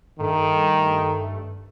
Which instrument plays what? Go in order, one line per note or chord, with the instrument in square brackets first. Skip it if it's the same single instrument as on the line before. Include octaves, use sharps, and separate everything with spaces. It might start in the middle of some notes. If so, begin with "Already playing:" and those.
[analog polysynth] G2 A3 [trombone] D#3